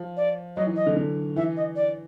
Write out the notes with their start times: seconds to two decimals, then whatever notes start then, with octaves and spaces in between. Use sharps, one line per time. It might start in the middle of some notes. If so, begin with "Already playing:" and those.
Already playing: F3
0.17 D5
0.56 F#3 D#5
0.67 E3
0.76 D#5
0.87 D3
0.97 D3
1.36 E3 E5
1.57 D#5
1.76 D5